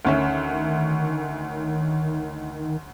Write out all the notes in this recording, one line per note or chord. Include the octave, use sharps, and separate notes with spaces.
D2 D#3 C#4 E5